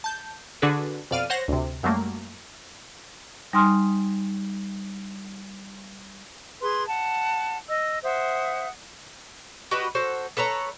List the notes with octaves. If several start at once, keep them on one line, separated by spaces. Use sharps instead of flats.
A5 G6
D3 D4 F#4 G#4 A4 B4
F2 B2 D5 F5 F6 D#7
C5 C#5 F#5 A#6
D2 C3
F#2 F#3 G3 A3 A#3
G3 D#4 G#5 C6 D#6 F6
G#4 B4 C6
F#5 A5
D#5 E6
C5 E5 F#5 D#6
F#4 G4 B4 D#5
F#4 A4 C5
A4 B4 C#5 A#5